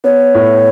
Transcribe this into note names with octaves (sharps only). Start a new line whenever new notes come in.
B3 C#5
A2